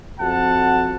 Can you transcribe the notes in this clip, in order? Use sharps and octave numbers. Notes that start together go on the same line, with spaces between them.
F2 F#4 F#5 A5